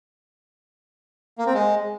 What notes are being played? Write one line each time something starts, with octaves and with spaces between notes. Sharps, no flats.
A#3
C4
G#3